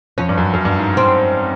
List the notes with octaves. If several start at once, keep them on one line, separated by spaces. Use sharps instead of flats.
F2 C#4
G2
F#2
F#2
G2
G#2
C4